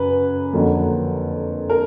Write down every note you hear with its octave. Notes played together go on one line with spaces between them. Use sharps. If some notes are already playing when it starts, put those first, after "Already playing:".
Already playing: F#2 C#3 B4
F2 D3 F#3 A#3
A#4